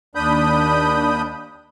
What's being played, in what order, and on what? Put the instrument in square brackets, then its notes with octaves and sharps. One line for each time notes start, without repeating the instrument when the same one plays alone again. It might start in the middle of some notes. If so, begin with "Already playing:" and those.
[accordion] D#2 D4 B5 D#6 G6